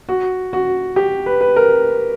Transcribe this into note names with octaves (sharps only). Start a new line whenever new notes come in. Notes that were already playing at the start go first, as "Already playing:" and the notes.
F#4
F#4
G4
B4
B4
A#4